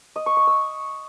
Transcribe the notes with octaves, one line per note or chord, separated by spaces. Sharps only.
D#5
C#6
C#6
E6